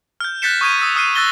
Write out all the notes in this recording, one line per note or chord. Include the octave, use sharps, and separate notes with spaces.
F6 G6
F#6 G6 A6 B6 C#7 E7
C#6 D#6 G#6 D#7
D#6 E6 B6
D#6 F6 C7 D#7 E7
E6 F#6 A6 A#6 G7